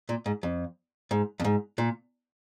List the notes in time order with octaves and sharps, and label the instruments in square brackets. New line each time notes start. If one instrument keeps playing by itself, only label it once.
[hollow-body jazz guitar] A#2
G#2
F2
G#2
F2
G#2
A#2